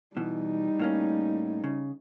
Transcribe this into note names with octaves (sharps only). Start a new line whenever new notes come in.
B2 E3 G3 D#4
A2 A#3 C#4
C#3